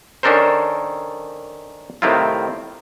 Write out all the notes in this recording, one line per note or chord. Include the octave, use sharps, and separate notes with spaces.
D#3 C#4 D4 A4 A#4 C5
A2 C3 D#3 C4 E4 F4